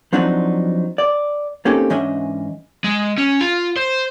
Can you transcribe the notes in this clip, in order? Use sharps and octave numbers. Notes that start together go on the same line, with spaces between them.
F3 F#3 C4 D4 D#4
D5
A#3 C4 C#4 D#4 G4 A4
G#2 E3 C#4 D4 D#5 E5
G#3
C#4
F4
C5